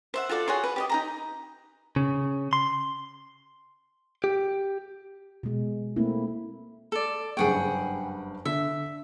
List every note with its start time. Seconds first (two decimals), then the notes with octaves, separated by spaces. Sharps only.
0.14 C5 E5 F#5
0.29 F4 F#4 A4 D5
0.48 F#4 G#4 C#5 C6
0.64 B4
0.76 G4 C#5 D#5
0.90 D#4 G#4 A#5
1.96 C#3
2.53 C6
4.24 G4
5.43 B2 G#3
5.96 A3 A#3 C4 E4
6.92 A4 D5
7.37 F#1 G2 G#4 F#5 G5 C#6
8.45 D3 E5